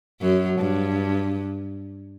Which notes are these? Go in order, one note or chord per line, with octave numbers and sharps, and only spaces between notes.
F#2 F#3
G2